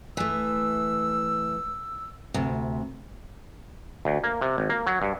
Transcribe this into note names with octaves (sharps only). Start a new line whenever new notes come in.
E3 A3 E6
D2 C3
D2
A#3
C3
G#1
A#3
F#3
G2